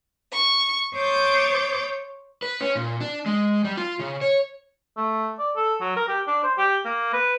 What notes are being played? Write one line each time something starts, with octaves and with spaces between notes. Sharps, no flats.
C#6
C5 C#5 D6 D#6 G6 A6
B4
C#4
A#2
D4
G#3
G3
F4
C#3
C#5
A3
D5
A4
F#3
A#4
G4
D4
C5
G4
A#3
B4